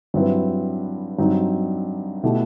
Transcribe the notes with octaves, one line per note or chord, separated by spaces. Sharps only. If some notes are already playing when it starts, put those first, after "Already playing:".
G2 F#3 C4 E4 B4
G2 F#3 C4 D#4
B2 A3 E4 G4